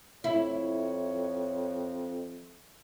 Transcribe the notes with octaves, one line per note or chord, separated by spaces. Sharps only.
F2 E4 C#5